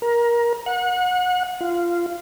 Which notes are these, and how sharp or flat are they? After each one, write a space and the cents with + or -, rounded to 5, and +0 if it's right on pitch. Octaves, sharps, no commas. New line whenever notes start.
A#4 +20
F#5 -30
F4 -15